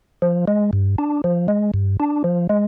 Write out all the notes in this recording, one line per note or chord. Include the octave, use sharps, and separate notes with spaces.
F3
G#3
G2
D4
F3
G#3
G2
D4
F3
G#3